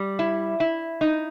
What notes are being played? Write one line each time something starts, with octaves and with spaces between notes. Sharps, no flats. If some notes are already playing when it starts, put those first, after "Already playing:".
Already playing: G3
E4
E4
D#4